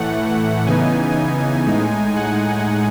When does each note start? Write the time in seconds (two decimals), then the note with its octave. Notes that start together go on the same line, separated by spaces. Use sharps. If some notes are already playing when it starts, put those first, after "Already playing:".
Already playing: A2 E3 A3 F#5
0.66 C#3 E3 B3 D#4 G#5
1.66 A2 G#3 D#4
2.16 F#5